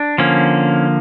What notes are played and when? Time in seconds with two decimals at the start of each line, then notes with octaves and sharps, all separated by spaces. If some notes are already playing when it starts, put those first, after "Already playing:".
Already playing: D4
0.18 D3 F3 A#3 C#4